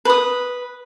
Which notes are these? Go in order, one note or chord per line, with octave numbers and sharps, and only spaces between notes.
B4 D#6